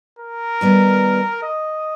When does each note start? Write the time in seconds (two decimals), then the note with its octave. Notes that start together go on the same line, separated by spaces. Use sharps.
0.19 A#4
0.61 D#3 G3 B3
1.43 D#5